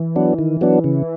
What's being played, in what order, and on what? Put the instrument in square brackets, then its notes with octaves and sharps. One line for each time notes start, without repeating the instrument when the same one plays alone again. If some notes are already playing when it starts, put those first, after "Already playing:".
Already playing: [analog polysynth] E3
[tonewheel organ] F#3 B3 D4
D#3
F#3 B3 D4
[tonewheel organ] C#3 [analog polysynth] E3